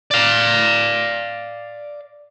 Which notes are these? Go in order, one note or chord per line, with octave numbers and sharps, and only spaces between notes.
D5 F5